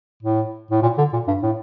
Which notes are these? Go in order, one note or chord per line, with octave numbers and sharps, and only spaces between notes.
A2
A2
A#2
D3
A#2
G2
A2